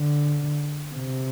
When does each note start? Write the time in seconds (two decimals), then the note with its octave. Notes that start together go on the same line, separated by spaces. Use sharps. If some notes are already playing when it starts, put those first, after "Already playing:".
Already playing: D3
0.95 C3